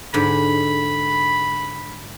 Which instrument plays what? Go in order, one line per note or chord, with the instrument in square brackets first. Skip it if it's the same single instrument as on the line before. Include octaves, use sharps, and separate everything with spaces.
[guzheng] G#2 D3 [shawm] B5